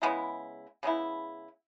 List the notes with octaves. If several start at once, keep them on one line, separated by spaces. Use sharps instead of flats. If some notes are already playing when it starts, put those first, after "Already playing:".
C#3 G#3 B3 E4
C#3 G#3 B3 E4